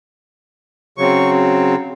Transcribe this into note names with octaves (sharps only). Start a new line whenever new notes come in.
C#3 F#3 C4 C#6